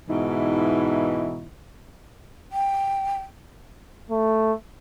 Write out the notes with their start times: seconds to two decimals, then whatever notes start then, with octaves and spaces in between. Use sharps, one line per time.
0.07 G#2 B2 E3 D#4 E4
2.52 G5
4.10 A3